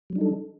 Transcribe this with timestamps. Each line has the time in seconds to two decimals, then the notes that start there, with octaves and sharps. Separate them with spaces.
0.10 F#3
0.13 G3
0.16 D4
0.18 D#4
0.21 A4